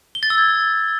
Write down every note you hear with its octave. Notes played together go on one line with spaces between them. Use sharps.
G7
A6
E6
G#6